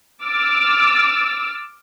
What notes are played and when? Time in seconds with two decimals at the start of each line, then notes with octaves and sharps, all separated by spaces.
0.23 D6 E6 F6 A6